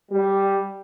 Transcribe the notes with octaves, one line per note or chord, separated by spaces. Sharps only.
G3